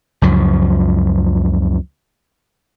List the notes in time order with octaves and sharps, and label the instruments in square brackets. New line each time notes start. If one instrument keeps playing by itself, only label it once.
[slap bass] C#2 F#2 F3